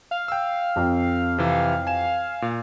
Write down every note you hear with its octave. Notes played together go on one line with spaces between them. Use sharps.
F5
G5 E6
F2
C3 E3
G#5 E7
A#2